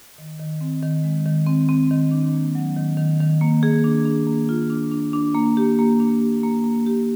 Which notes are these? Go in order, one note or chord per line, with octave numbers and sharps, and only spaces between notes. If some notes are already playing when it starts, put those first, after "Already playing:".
D#3
D#3
C4
D#3
G#3
D#3
C4
C4
D#3
D4
A#3
F#3
D#3
D#3
D#3
A#3
G#4
D4
D4
A#3
F4
D4
D4
D4
A#3
G4
A#3
D4
G4
A#3
A#3
G4